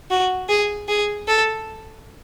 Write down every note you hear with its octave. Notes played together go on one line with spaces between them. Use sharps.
F#4
G#4
G#4
A4